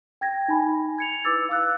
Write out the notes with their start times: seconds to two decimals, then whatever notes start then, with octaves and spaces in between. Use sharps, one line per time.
0.21 G5 G#6 A#6
0.48 D#4 G#5 B5
0.98 G#6 C#7 F7
1.24 E4 B4 D6 E6 A6
1.49 F5 D6 E6 F#6